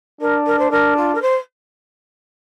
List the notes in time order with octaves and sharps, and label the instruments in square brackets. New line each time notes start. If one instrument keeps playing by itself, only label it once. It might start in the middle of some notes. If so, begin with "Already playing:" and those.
[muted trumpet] D4 [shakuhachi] A#4
[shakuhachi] A#4
C5
[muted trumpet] D4 [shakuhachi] A#4
[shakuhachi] F4
A#4
C5